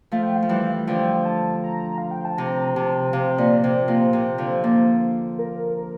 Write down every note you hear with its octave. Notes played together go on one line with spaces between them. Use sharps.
F3 A3 F5
G5
F5
F3
E3 G3
D3 F3 G5
A5
A#5
F5
G5
A5
C3 A#5
C3 A5
C3 F5
A#2 D5
C3 C5
A#2
C3
D3 F3
A#3 D4
A#4